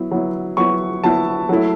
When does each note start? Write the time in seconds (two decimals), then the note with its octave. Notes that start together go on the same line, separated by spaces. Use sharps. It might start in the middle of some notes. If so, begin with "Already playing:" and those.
Already playing: F#3 B3 E4
0.11 F#3 B3 E4
0.57 F#3 B3 E4 C#6
1.03 F#3 B3 E4 A5
1.49 F#3 A3 E4